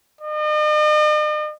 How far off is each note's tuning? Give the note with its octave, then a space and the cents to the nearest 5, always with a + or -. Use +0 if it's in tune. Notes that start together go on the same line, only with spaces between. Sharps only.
D#5 -45